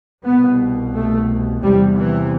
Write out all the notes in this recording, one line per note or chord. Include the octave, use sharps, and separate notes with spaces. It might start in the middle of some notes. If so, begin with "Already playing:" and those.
C2 B2 B3
A3
E2 C3 G3
E3